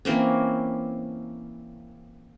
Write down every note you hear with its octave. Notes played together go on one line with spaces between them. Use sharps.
E3 A#3 C4 C#4